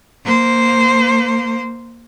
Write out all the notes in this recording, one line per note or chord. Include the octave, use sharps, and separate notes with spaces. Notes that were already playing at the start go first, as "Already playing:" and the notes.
A#3 C5